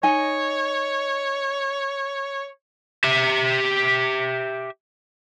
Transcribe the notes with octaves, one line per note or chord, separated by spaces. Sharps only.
D#4 C#5 D#5 G#5
G4 E5